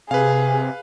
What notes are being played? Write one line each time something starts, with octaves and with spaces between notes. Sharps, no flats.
C3 G#4 B4 F5